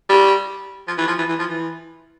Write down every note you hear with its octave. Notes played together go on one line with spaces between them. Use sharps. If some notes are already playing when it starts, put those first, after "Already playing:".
G3
F3
E3
F3
E3
E3
F3
E3